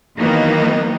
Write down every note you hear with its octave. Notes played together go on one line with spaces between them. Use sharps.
D#3 E3 F#3 A#3 B3 D#4